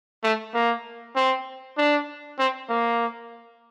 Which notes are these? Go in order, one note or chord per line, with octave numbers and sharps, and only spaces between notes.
A3
A#3
C4
D4
C4
A#3